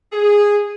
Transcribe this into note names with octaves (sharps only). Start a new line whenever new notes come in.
G#4